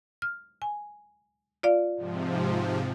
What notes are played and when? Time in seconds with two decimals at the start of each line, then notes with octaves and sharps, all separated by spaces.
0.22 F6
0.62 G#5
1.63 F4 D5 F5
1.96 G#2 C3 F3